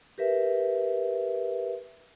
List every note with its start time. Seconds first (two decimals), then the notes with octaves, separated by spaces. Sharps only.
0.18 G4 A#4 B4 E5